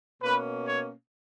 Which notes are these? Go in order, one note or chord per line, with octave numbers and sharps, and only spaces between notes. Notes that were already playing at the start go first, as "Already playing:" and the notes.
B2 A#3 C#4 B4
C#5